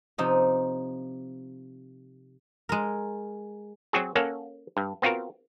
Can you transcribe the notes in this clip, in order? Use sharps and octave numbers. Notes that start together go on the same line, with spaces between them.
C3 F3 D#4 C#5
G#3 A#4
F#3 C4 F#4 G#4
A#3 C#4 A4 C#5 F#5
G2
B3 C4 F4 F#4 A#4